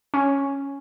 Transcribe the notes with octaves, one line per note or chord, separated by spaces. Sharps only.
C#4